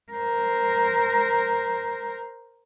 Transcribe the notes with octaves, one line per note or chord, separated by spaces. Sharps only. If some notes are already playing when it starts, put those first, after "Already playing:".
A#4 C5